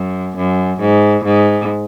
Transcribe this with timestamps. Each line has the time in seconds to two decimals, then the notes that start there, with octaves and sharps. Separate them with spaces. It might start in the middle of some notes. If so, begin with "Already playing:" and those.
Already playing: F#2
0.36 F#2
0.80 G#2
1.25 G#2